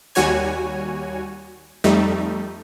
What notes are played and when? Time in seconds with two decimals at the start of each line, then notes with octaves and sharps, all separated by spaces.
0.15 D#2 G3 F#4 C#5 G#5
1.84 F2 G3 A3 D#4